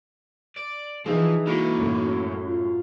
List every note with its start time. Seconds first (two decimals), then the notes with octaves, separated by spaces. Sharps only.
0.56 D5
1.06 E3 F3 D#4 G#4
1.47 A#3 E4 F#4 A4
1.77 F#2 A2
2.44 F4